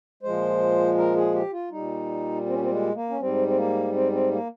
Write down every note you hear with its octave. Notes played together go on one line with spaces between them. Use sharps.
A#2 F3 G#3 C5
A#4
G#4
G4
F4
A#2 G3 D#4
C4
C#4
C4
G#3
A#3
C#4
G#2 G3 C4
C4
A#3
C4
C4
A#3